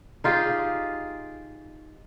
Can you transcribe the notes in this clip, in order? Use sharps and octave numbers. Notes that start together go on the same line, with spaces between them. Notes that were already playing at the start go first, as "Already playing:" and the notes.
D#4 F4 G4 G#4